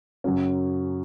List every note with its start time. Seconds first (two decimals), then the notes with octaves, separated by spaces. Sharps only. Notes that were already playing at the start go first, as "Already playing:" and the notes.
0.24 F#2 C#3 F#3 C#4